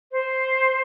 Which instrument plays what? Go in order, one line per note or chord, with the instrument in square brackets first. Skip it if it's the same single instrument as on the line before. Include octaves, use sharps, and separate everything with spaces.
[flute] C5